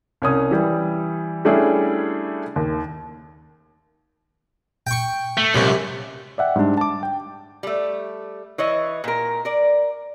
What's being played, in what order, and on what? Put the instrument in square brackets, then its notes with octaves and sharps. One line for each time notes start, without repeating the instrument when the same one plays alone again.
[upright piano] C2 C#4 D#6
E3 G3
G3 A3 C#4 D4 E4 G#4
D#2
[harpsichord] G5 C#6
[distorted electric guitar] A3
[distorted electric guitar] C#2 [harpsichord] F#2 C3
[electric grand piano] D5 E5 F#5 G5
G#2 G3 G#3 D4
A5 D6
G5
[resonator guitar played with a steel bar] G3 A3
E3 C#5 D#5
A#2 A#4
A#4 D5